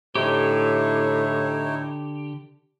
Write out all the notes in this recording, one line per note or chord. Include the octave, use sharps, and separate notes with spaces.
A2 D3 D#4 E4 G4 C#5